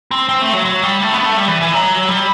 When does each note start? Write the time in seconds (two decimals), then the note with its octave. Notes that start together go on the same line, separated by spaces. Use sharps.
0.11 C4
0.29 C4
0.42 A3
0.53 F#3
0.65 F#3
0.83 G3
1.01 A3
1.12 B3
1.24 A3
1.37 G3
1.48 E3
1.61 E3
1.72 F#3
2.09 G3